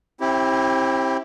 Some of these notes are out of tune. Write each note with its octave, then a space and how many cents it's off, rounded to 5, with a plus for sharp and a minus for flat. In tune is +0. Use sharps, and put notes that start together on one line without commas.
C4 +35 E4 -10 G4 +0